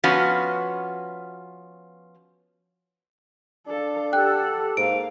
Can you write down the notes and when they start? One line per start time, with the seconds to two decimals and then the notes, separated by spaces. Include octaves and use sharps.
0.04 F3 B3 C#4 F#4
3.67 D4 A4 F5
4.13 G4 A4 F#5 G5 F#6
4.77 G#2 A#3 F5 D7